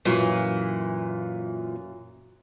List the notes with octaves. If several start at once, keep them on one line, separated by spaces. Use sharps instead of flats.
F#2 A#2 E3 F4 C#6